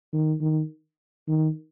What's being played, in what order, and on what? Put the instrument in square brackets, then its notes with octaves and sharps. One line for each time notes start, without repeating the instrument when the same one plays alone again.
[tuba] D#3
D#3
D#3